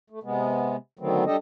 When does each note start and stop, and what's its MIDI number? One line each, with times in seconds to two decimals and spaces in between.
0.10 0.19 57
0.23 0.77 48
0.23 0.77 56
0.23 0.77 59
0.99 1.24 50
0.99 1.24 51
0.99 1.24 54
0.99 1.24 57
0.99 1.24 59
0.99 1.24 60
1.26 1.36 55
1.26 1.36 62
1.26 1.36 67
1.26 1.36 69
1.26 1.36 75